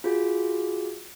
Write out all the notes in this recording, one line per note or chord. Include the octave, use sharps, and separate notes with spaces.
F4 F#4 G#4